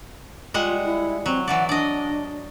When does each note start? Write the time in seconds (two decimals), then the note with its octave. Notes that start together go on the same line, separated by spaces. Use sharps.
0.54 G3 G#3 F4 F#5
0.84 E4
1.26 F#3 C4
1.48 E3 F#3 D5 F#5
1.69 D4 D5 D#5